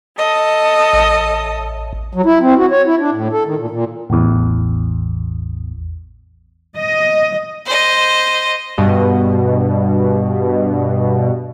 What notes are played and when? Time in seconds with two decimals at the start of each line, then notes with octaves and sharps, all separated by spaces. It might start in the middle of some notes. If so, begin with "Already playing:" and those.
0.17 A4 D#5
0.93 A1
2.13 F#3
2.25 E4
2.40 C4
2.58 F#4
2.71 C#5
2.87 E4
3.00 D4
3.12 A2
3.33 A4
3.45 D#3
3.57 A#2
3.70 A#2
4.10 A1 E2
6.76 D#5
7.66 C5 D#5
8.78 G2 B2